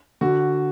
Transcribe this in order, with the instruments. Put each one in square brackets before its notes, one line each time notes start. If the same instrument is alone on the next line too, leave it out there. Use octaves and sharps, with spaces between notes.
[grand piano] D3 F#4